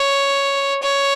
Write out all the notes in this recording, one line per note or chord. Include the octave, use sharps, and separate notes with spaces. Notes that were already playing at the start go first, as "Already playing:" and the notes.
Already playing: C#5
C#5